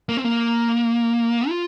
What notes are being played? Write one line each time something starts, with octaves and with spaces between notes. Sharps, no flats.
A#3
C4
A#3
F4